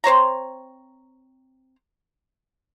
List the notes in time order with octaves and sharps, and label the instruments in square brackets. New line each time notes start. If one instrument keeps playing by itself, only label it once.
[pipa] C4 C5 C#5 A#5